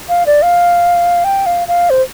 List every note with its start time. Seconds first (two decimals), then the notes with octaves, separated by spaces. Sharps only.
0.09 F5
0.26 D5
0.42 F5
1.24 G5
1.46 F5
1.68 F5
1.90 C5